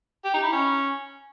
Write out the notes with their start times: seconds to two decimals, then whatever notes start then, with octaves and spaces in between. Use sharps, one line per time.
0.25 G4
0.34 D#4
0.43 E4
0.53 C#4